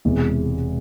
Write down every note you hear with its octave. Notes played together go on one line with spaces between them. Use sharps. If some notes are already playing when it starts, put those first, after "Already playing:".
E1 E2 C3 G#3